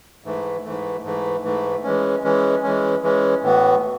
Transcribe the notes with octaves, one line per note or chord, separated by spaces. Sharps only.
G#2 E3 A3
G#2 E3 A3
G#2 E3 A3
G#2 E3 A3
E3 G#3 C#4
E3 G#3 C#4
E3 G#3 C#4
E3 G#3 C#4
A2 E3 B3 F#4